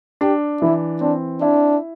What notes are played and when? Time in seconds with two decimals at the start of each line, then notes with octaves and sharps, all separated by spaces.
0.21 D4 G4
0.61 E3 E4
1.01 C4 D4
1.41 D4 E4